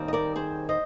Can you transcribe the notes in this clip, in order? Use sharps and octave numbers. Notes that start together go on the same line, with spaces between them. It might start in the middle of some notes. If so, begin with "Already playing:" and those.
Already playing: D#2 D#3 G3 C4
D#5
A#4 D5
G#4 C5
C5 D#5